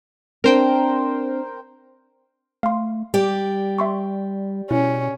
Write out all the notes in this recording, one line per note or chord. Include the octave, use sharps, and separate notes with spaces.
C4 D4 A#4 C5 G5
A3 F5 C6
G3 G4 D5
E5 C6 C#6
B2 C#4 E4